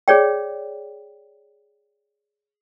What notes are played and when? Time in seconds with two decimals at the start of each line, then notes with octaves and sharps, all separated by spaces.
0.08 G#4 C#5 D5 G5